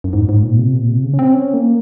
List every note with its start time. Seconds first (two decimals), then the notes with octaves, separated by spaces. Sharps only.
0.04 F#2
0.13 G#2
0.29 G#2
0.43 A#2
0.59 C3
0.74 A#2
0.89 C3
1.03 C#3
1.14 C#4
1.19 C4
1.33 C#4
1.54 A#3